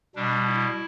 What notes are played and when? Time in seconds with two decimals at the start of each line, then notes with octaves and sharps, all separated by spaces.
0.15 B2 G3 D4
0.46 E4